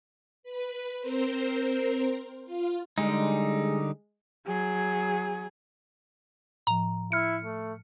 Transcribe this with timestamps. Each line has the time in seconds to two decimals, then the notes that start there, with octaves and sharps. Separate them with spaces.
0.43 B4
1.00 C4 A#4 C5
2.45 F4
2.98 D3 G3 G#3 D#4
4.47 F#3 G#4
6.67 A2 F3 A#5
7.12 E4 F6 C#7
7.45 A3